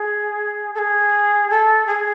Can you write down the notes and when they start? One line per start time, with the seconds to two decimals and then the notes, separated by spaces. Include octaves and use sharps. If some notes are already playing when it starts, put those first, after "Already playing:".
Already playing: G#4
0.74 A4
0.78 G#4
1.50 A4
1.87 G#4